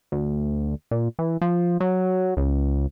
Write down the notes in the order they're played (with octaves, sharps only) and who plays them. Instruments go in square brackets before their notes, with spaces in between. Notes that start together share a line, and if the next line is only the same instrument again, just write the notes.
[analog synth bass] D2
A#2
E3
F3
F#3
C#2